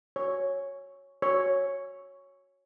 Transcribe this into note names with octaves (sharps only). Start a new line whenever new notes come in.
C#5
C#5